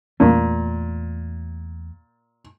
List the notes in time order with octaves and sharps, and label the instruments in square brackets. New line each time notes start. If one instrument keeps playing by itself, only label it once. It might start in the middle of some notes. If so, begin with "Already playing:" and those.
[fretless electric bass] E2 A3 [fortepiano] A#2